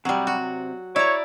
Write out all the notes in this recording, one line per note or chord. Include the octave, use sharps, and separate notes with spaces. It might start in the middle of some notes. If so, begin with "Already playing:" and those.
C3 F#3 G3
F#4
E4 C#5 D5 A#5